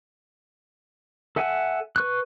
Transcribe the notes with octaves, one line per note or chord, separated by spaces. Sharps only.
A4 E5 F#5 G#5
B4 C#6 F#6